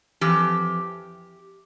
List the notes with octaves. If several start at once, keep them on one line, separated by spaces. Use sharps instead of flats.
F2 E3 G4